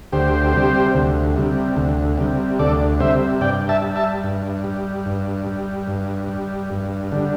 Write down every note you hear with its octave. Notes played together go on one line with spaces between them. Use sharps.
D2 G4 C5
C3 G3
D2
C3 G3
D2
C3 G3
D2 A4 D5
C3 G3 C5 E5
G2 D5 G5
E5 A5
G3
E5 A5
G2
G3
G2
G3
G2
G3
G2
D3 G3